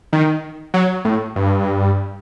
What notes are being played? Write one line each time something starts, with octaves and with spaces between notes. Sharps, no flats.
D#3
F#3
A2
G2